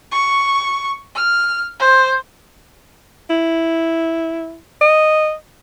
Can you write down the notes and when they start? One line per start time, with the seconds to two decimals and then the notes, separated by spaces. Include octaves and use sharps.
0.12 C#6
1.16 F6
1.80 C5
3.30 E4
4.81 D#5